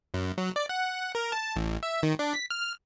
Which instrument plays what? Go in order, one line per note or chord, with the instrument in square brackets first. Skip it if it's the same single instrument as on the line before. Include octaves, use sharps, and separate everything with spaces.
[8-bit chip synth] F#2
F#3
D5
F#5
A#4
A5
A1
E5
D#3
D4
B6
F6